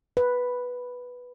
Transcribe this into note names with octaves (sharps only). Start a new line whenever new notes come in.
B4